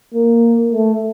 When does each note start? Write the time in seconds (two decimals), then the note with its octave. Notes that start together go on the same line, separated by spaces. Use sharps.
0.14 A#3
0.72 A3